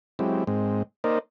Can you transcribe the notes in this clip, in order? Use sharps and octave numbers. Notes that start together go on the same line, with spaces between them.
F#3 G#3 C4 E4 G4
G#2 G#3 C4
A#3 D#4 A#4 C5 D5 D#5